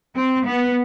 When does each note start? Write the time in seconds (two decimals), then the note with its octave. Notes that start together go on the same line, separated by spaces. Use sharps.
0.14 C4
0.46 B3